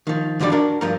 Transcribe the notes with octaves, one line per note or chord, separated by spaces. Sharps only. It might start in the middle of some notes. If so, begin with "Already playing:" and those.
D#3 F3
F#2 D3 F3 G3 D5
D4 F#4 A#4
G2 F3 A#4